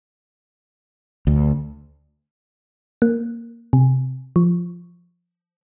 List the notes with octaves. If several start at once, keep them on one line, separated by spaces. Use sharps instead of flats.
D2
A#3
C3
F3